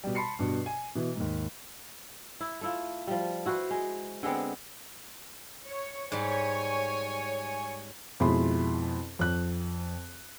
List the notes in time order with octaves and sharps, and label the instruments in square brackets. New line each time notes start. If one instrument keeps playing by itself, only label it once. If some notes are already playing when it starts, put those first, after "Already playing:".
[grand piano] B2 G3
A5 B5 C6 C7 C#7
G2 B2
G#5
B2 E3
D#2 G#2
[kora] E4
A3 E4 F4
F3 G3
E4 F#4 B4 C5
G#3
D3 G#3 B3 C4
[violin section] C#5
[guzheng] G#2 G3 [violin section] C#5 G#5
[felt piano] F2 B2 G#3 E4 B5 C6
F2 F#6